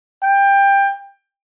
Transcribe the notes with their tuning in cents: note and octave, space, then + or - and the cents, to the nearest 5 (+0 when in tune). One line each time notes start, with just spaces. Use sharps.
G5 +20